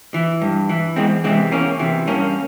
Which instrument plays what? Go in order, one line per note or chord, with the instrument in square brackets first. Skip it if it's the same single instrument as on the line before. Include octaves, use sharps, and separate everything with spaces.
[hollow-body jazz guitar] E3
G2
E3
E2 G#3 C4
C3 E3 G#3 C4
E2 A#3 C#4
C3 E3
G2 A#3 C#4